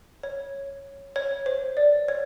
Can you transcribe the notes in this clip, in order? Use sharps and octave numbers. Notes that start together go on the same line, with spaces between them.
C#5
C#5
C5
D5
C#5